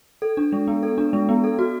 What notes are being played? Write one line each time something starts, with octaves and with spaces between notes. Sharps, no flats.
A4
D4
G#3
B3
A4
D4
G#3
B3
A4
F#4